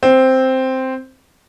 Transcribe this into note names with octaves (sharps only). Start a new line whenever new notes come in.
C4